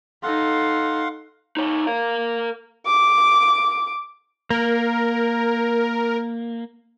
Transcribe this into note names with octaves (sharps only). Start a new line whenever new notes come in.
D#4 A4 F5 F#5 C6
D#4 C#5
A#4 F5
D6
A#3 A#4